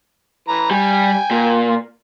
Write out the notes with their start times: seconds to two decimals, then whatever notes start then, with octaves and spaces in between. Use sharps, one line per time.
0.48 E3 A#5
0.71 G3 G5 G#5
1.31 A#2